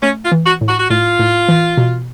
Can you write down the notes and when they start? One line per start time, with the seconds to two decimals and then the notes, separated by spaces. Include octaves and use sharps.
0.03 A3 C#4
0.25 F4
0.32 E3
0.46 F#4
0.61 A2
0.68 F#4
0.79 F#4
0.90 A2 F4
1.19 A2
1.49 E3
1.77 B2